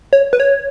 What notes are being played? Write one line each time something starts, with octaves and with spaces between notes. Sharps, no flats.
C#5
B4
C#5